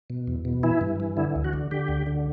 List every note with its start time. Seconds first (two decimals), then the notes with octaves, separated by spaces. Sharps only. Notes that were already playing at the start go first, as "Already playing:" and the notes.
0.10 B2
0.27 E2
0.45 B2
0.63 E3 E4
0.81 G2
1.00 E3
1.17 D3 E4
1.36 D2
1.44 F#4
1.53 D3
1.71 D3 G4
1.88 D2
2.07 D3